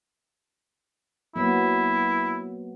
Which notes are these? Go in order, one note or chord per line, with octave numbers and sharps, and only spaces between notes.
F#3 A#3 B3 E4